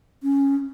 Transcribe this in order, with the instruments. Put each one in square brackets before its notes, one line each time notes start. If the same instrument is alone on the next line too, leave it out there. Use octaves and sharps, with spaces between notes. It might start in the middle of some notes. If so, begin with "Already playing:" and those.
[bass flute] C#4